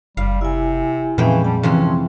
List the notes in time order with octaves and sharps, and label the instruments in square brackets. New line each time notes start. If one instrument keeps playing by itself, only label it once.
[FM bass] F#1 [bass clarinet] G3 [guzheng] F5
[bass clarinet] C3 [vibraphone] E4 G#5
[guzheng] F2 G#3 G5 [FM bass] A#2 [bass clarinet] E3 [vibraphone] C#4 E5 F5
[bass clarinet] G3 [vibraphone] A5
[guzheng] F2 C3 E3 [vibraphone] C4 C6 [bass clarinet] C#4